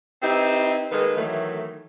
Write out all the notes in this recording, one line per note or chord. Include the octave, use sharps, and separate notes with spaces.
C4 D#4 E4 G4 B4
D#3 G#3 A#3 A4 B4
D#3 E3 F#3 A3